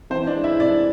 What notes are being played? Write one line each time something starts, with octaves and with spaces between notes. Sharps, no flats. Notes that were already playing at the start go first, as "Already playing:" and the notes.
E3 C4 C5
D4 D5
G#3
E4 E5
C2 D4 D5